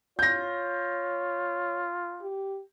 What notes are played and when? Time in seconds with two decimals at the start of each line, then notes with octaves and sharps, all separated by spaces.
0.19 F4 C#5 G6 A#6
2.22 G4